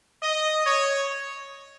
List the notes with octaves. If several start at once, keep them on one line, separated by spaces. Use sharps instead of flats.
D#5
C#5